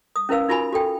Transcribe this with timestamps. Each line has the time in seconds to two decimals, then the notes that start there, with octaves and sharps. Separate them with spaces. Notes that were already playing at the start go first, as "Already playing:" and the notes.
0.16 D#6
0.29 C#4 E4 A#4 B4 F5 E6
0.48 D#4 F4 F#4 A#4 G#5 B5
0.73 F#4 A4 G5